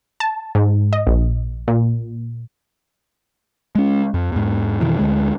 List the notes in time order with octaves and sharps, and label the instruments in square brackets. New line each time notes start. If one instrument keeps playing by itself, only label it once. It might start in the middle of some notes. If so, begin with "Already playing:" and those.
[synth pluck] A5
G#2
D#5
A#1
A#2
[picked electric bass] G#3 C#4
F2
E2 G#2
F2 B2 D#3 E3
D2 D3 G#3